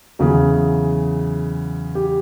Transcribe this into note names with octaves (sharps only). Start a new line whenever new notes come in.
E2 C#3 F#3 G#4
G4